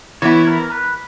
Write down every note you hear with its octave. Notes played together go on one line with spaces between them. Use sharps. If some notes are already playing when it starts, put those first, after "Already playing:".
E3 B3 E4 C#5
A#4
B4